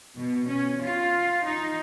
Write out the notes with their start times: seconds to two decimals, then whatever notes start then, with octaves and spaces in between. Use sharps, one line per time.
0.17 B2
0.47 C#4
0.82 F4
1.44 D#4